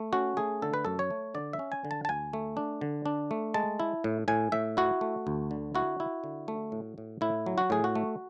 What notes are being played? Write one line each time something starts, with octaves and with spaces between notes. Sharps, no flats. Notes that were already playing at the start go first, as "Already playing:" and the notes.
Already playing: A3
C#4 F#4
A3 G#4
D3 A4
B4
F#2 A4
C#5
A3
D3 D5
E5
C#4
G#5
D3
A5
A5
D2 G#5
A3
D4
D3
D4
A3
G#3 A5
E4
A2
A2 G#5
A2 E5
E4 F#4
A3
D2
D3
E4 F#4
E4
D3
A3
A2
A2
A2 E4
F#3
F#4
A2 G#4
F#4
A3